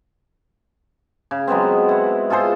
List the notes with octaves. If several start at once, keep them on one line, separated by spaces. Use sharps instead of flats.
C#3
F#3 G#3 B3 C4
E4 F#5
F4 G#4 A4 C5